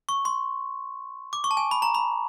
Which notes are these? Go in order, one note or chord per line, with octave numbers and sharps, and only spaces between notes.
C#6
C6
D6
C#6
A5
G#5
B5
A#5
B5